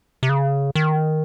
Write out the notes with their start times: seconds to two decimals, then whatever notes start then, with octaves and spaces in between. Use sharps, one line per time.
0.23 C3
0.29 C#3
0.75 D#3